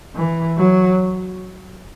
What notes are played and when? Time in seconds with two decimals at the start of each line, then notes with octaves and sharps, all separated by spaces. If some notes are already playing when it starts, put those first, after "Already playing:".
0.16 E3
0.58 F#3